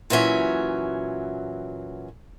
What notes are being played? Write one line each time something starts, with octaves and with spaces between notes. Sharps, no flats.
A#2 E3 F#3 C#4 E5